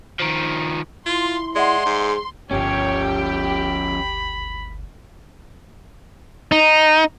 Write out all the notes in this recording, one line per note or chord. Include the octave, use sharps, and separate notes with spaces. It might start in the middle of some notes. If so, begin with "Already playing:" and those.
D#3 F3
E4 F4 C6
G#3 D5 E5 F#5 C6
G#2 G#4
G1 D2 F3 C#4 G4 C#5
B5
D#4